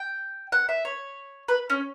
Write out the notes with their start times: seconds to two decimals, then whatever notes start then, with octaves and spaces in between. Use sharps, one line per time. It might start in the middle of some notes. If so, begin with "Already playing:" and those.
Already playing: G5
0.52 F#5
0.69 E5
0.85 C#5
1.48 B4
1.70 C#4